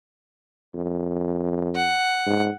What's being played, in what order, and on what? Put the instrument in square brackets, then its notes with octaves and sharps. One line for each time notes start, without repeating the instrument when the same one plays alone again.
[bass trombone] F2
[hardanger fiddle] F#5
[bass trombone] G#2